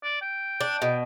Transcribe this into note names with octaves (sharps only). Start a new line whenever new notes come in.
D5
G5
D4
B2